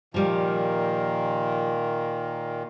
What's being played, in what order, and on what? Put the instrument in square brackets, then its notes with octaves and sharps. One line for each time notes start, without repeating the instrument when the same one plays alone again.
[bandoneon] A#2 D#3 [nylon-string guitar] F3 G3